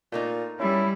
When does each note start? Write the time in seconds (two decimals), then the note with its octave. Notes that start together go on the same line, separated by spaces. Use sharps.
0.12 A#2 A3 A#3 D#4
0.59 G3 C#4 E4